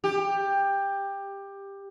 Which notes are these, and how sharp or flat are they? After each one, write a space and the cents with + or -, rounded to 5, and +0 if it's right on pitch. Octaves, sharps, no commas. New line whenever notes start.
G4 +15